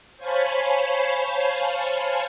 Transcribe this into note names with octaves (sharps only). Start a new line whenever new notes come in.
C5 C#5 F5 G#5 A5 B5